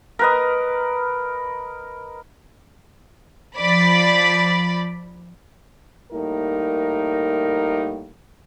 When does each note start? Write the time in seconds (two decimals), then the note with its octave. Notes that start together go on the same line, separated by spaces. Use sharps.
0.19 A#4 B4 D#5
3.56 F3 D5 B5
6.12 A2 G3 A#3 D#4 A#4